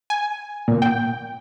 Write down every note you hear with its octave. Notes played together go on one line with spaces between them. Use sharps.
G#5
A#2
G5